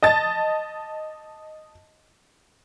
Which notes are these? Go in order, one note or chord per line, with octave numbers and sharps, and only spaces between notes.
D#5 A5 A6